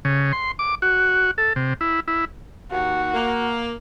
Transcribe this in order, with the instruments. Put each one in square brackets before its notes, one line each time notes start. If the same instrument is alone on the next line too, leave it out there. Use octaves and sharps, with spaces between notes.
[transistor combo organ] C#3
C6
D6
F#4
A4
C3
E4
E4
[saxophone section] D#2 [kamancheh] F#4
[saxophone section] A#3